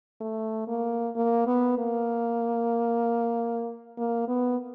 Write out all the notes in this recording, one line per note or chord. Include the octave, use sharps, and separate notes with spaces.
A3
A#3
A#3
B3
A#3
A#3
B3